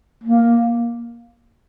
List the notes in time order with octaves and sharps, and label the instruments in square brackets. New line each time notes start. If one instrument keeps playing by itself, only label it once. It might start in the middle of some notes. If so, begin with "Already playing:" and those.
[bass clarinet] A#3